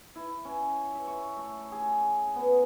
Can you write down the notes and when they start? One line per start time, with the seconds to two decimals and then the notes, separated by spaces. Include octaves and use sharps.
0.15 E4
0.45 C#4
0.95 E5
1.07 C#6
1.37 A3
1.72 G#4
2.36 B3